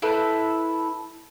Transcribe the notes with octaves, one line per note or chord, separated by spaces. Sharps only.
E4 A4 B4 C5